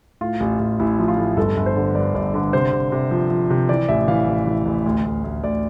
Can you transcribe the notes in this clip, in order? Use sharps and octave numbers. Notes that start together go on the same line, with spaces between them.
A2 F4
A1
A1
A1 E4
F3
F4
A2
G1 A4
G1
C5
D3
G2 D5
G1 D5
D3
C3 C5
C3
C3
F3
F3
C3
E3 D5
A1 E5
E3 F5
A1
E3
A1
D2
D2
D2
D2 D5